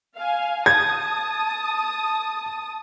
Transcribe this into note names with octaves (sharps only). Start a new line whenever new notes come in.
F5 G#5
A5 D#6 G#6